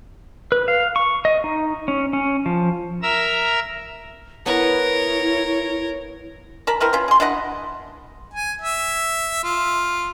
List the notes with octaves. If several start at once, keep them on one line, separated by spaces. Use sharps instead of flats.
B4
F5
C#6
D#5
D#4
C#4
C#4
F3
A#4 E5 A#5 E6
B3 E4 A#4 B4 C#5 C#6
A#4 A5 B5
C4 E4 A#4 B4
C#4 F4
G#4 C6
D4 E4 D#5 F#5
G#5
E5
F4